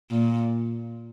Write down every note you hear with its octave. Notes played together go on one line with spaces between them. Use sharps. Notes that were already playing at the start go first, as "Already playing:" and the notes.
A#2